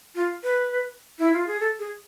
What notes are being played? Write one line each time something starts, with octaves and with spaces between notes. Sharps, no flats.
F4
B4
E4
F4
G#4
A4
G#4